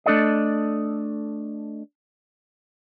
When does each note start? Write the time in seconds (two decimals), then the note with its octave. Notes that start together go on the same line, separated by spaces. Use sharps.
0.06 A3 D4 A4 D5 D#5